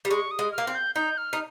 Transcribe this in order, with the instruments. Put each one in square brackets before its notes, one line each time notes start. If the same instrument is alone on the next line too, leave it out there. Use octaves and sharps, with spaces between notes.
[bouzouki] G3
[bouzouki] G#3 [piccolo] C#6
[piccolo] D#6
[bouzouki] G#3
[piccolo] F6
[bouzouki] A#3
C4
[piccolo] G6
[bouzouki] D#4 [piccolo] G6
[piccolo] F6
[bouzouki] D#4